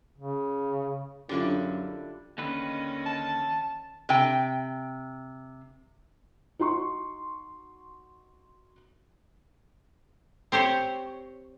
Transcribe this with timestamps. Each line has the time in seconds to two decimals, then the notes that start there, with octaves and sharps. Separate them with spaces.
0.18 C#3
1.29 F#2 D3 G3 D4 E4 F4
2.38 D#2 D3 D#3 C#4 B4
3.06 A5
4.09 C3 G5
6.59 D#4 F#4 C6 C#6
10.52 C4 G4 C5 C#5